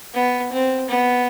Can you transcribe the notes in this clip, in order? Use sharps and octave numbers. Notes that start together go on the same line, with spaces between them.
B3
C4
B3